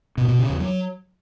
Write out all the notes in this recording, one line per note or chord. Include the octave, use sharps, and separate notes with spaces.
B2
B2
C#3
E2
F#3